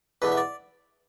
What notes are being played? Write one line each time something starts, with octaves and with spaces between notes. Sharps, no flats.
E2 B2 A3 D4 B4
E5
D5